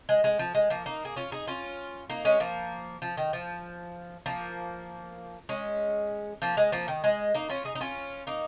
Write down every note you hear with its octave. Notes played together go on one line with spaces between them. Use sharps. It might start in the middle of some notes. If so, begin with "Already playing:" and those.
G#3
G#3
F3
G#3
F3 A#3
A#3 D#4
G#4
C#4 F4
D#4 G#4
C#4 F4
A#3 D#4
G#3 C#4
F3 A#3
F3
D#3
F3
F3 A#3
G#3 C#4
F3 A#3
G#3
F3 A#3
D#3
G#3
A#3 D#4
C#4 F4
D#4 G#4
D#4
C#4 F4
A#3 D#4